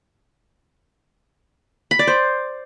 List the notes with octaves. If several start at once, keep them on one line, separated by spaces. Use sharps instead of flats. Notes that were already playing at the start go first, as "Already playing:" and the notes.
B5
D5
C5